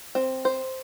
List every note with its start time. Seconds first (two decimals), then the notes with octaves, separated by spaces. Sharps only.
0.15 C4
0.45 C5